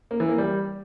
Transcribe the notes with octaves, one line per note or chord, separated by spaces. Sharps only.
A#3
E3
A#3
G3